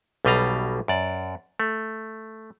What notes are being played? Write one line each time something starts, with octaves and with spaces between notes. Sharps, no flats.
B1 B2 G3 D#5 F5 A#5
F#2 D5
A3